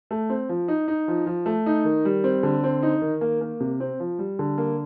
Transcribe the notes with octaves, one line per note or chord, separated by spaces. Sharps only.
A3
C4
F3
D#4
D#4
F3
F3
A3
D#4
D#3
G3
C4
D3
C4
D#4
D#3
A#3
A#3
C3
C4
F3
G3
D3
A#3